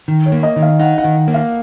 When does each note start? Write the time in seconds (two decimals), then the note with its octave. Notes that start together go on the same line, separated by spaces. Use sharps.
0.08 D#3
0.26 C#5
0.32 A#3
0.43 D#5
0.56 D#3
0.62 F5
0.80 D#4 F#5
0.98 F#5
1.04 D#3
1.28 A#3
1.34 F5